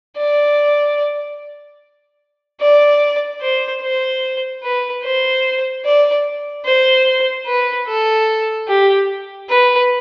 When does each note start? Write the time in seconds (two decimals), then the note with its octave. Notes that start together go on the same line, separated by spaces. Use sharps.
0.17 D5
2.61 D5
3.41 C5
3.82 C5
4.63 B4
5.03 C5
5.85 D5
6.65 C5
7.46 B4
7.87 A4
8.68 G4
9.49 B4